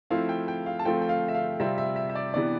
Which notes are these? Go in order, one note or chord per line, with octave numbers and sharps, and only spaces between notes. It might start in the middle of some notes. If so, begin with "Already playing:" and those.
F3 A3 C4 E4 F5
G5
G5
F5
A5
F3 A3 C4 F4 G5
G5
F5
E5
F5
C3 G3 C4 F4 E5
E5
E5
E5
D5
C3 E3 B3 D4 D5